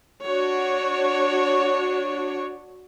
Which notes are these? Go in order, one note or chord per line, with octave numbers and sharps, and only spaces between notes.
D4 F#4 C#5